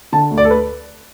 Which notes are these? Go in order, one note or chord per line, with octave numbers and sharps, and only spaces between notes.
D3 A5
D2
D5
A4
B4